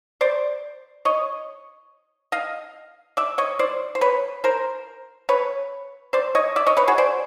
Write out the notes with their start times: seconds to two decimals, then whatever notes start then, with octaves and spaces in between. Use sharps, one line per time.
0.21 C5 D5
1.05 C#5 D#5
2.32 D#5 F5
3.17 D5 E5
3.38 C#5 D#5
3.59 C5 D5
3.95 C5
4.01 B4 C#5
4.44 A#4 C5
5.29 B4 C#5
6.13 C5 D5
6.35 C#5 D#5
6.56 D5 E5
6.67 C#5 D#5
6.77 B4 C#5
6.88 F#4 G#4
6.98 C5 D5